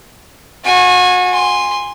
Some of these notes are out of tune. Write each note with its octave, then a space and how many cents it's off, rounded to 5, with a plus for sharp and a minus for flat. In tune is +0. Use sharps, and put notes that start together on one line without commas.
F#4 -35 G#5 +0
G#5 -20 C6 +0